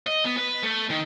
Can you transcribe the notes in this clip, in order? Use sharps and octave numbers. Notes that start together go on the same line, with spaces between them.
D#5
B3
B4
A3
D#3